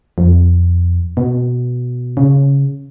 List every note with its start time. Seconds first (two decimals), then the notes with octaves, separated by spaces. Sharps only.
0.18 F2
1.17 B2
2.17 C#3